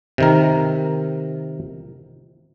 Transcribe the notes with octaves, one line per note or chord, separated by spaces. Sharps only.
C3 D#3 A#4